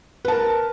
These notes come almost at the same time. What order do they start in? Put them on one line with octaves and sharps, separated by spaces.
B4 A5 A#4